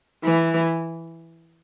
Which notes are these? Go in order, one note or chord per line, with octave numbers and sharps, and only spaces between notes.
E3